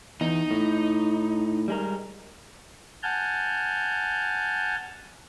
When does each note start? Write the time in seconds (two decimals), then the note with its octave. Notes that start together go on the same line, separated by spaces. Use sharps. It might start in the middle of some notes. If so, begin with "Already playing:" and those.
0.21 E2 D#4
0.51 A2
1.68 G3 G#3 A#4
3.03 F#5 G#5 A5 F6 G6